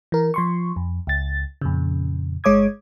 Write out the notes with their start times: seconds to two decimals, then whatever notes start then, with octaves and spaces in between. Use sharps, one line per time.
0.12 E3 A#4
0.34 F3 C6 C#6
0.76 F2
1.07 C#2 A6
1.61 F2 A#2 C#3
2.44 G1 G#3 C#5 D6 D#6 G#6